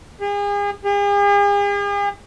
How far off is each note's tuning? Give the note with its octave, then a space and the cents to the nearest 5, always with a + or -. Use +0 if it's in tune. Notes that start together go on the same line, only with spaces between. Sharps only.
G#4 -40
G#4 -45